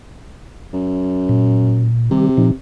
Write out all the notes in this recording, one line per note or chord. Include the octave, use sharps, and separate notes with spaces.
F#2
A#2
C3 D#3 G3 G4
A#2 F3 D#4